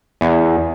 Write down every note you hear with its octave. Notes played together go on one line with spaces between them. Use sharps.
E2